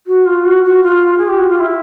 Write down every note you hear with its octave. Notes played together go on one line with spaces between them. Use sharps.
F#4
F4
F#4
F#4
F4
G#4
G4
F#4
F4
E4